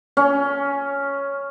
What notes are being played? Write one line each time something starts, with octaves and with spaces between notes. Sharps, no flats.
C#4